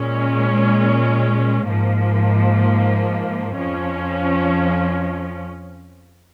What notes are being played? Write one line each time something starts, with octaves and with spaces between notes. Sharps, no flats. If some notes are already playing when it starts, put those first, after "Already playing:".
Already playing: A#2 G#3 C#4
G#2 F3 A#3
F2 F3 C#4